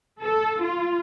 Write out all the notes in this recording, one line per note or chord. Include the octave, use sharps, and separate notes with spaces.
A4
F4